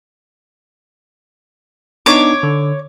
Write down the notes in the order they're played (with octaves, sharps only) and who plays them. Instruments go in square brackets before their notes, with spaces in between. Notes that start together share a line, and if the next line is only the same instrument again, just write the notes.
[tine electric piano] B3 D4 D#4 [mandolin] C#5 D6
[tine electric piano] D3